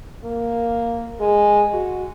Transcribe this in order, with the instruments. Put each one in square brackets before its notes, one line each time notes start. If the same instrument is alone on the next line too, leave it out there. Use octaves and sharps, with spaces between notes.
[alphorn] A#3
G#3
F#4